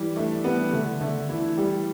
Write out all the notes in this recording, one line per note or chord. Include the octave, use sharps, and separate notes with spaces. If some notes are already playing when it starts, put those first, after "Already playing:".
Already playing: E3 G3
A3 D4
G3 B3
D3 A3
D3 A3
E3 E4
G3